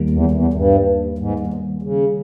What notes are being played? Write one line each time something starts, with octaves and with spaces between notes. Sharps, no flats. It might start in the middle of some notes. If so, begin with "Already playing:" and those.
Already playing: D#2 D#3 G3 A#3
E2
E2
G2
G#2
G2
E2
G2
C#3